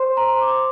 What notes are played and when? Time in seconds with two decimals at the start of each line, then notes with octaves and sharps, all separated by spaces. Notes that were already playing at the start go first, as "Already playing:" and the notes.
Already playing: C5 C6
0.17 A#5
0.41 D6